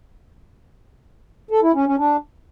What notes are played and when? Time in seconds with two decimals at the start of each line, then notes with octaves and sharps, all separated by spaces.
1.51 A4
1.63 E4
1.75 C#4
1.86 C#4
1.98 D4